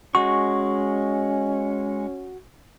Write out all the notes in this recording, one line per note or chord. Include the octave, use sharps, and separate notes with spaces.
G#3 C#4 F#4 C#6